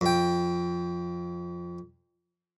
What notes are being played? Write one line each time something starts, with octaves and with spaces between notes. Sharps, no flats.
F2 G5